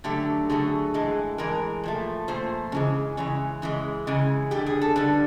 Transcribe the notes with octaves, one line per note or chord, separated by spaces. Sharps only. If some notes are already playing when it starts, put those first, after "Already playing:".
D3 F#3 A3 G4
D3 F#3 A3 G#4
A2 E3 G#3
A2 E3 G#3 A#4
A#2 F3 A3
A#2 F3 A3 C5
C#3 E3 G#3
C#3 E3 G#3 C#5
C#3 E3 G#3
C#3 E3 G#3
D3 G3 G4
G#4
A4
D3 G3 B4